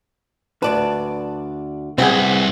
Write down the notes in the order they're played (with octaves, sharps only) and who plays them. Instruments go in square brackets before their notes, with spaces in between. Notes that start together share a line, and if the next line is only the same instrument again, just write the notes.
[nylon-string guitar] D2 D5 A5 [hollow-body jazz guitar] B4
[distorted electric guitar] C2 [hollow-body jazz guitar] C4 G#4 [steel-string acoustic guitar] B4 F#5